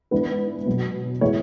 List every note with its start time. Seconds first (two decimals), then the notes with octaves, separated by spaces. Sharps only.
0.11 G#2 E3 B3 D4 B4
0.66 B2 F#3 B3
1.21 A2 E3 G#3 B3 E4 C#5